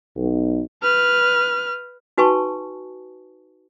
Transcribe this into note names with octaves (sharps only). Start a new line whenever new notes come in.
B1
B4 F6
D#4 F#4 B4 G#5 A5 C#6